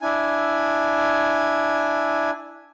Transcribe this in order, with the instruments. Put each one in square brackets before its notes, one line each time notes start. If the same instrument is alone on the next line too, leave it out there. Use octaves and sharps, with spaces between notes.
[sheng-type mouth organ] D4 E4 G#5